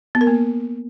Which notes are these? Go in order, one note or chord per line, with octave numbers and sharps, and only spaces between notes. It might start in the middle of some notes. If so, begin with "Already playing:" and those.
B3
A#4
A#3